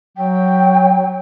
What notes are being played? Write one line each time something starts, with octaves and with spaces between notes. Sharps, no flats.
F#3 G5